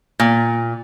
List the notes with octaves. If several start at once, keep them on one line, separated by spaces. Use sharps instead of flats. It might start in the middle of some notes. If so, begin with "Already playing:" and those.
A#2